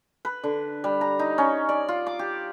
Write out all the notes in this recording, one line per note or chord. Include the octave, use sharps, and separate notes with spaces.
B4
D3
G3
A#5
D#4
C#4
D5
F4
D6
G4